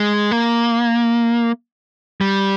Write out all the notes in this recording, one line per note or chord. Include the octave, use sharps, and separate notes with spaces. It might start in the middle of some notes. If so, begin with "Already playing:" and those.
Already playing: G#3
A#3
G3